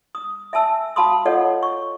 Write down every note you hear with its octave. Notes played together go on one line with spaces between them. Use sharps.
D#6
E5 G#5 A5 E6
F#4 F5 A5 B5 C6 D#6
F4 A4 C#5 D#5 F5 F#5
C#6